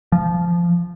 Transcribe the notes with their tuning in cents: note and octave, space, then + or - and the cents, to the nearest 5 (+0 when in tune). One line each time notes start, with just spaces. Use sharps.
F3 -10